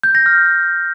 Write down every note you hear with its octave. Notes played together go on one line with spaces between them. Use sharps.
G6
A#6
F6